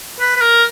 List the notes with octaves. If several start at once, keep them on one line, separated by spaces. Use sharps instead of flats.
B4
B4
A#4